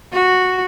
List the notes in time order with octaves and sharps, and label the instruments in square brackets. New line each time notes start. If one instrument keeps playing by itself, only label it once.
[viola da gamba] F#4